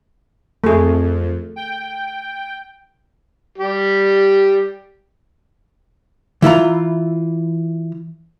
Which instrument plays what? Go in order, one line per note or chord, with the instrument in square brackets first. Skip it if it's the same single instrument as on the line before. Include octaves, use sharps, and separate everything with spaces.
[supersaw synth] F2 [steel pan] A3 G#4
[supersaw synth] G5
[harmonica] G3 G4
[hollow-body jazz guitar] E3 E4 F4 A#5